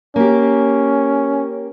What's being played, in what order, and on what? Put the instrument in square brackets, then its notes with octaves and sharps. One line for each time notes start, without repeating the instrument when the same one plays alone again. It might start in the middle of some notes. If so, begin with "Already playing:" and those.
[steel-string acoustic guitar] A#3 G4 [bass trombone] C#4